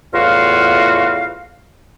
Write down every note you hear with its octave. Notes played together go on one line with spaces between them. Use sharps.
E2 A2 F4 F#4 F5